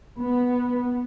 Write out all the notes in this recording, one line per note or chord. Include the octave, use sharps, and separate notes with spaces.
B3